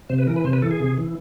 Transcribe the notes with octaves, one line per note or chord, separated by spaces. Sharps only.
C3 C5
B4
E3 A#4
B4
C3 C5
B4
E3 A4
G#4
C3
E3